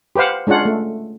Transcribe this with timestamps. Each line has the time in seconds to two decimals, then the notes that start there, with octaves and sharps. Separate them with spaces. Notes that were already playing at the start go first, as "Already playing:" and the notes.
0.16 G4 B4 C5 F5 F#5
0.47 G#3 C#4 D4 F4 F#5
0.65 A3